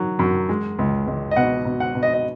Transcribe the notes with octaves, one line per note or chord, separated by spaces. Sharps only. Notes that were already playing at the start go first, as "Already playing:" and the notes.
Already playing: D#3 F#3
F#2
G#3
C#2
C#2
D#5
B2 F#5
B2
F#5
B2
D#5
D#5